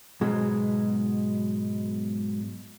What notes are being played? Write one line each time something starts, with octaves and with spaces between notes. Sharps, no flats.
G#2 B2 F#3 G#3